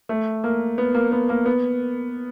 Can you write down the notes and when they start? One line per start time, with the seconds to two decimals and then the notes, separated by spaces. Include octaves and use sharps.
0.09 A3
0.44 A#3
0.78 B3
0.95 A#3
1.12 B3
1.29 A#3
1.46 B3